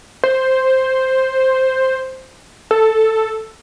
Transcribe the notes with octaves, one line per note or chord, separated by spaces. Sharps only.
C5
A4